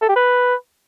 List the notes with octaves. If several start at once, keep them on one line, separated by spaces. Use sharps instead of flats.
A4
G4
B4